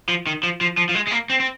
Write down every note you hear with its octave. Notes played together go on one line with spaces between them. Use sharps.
F3
D#3
F3
F3
F3
F3
G#3
G#3
A#3
C4
C4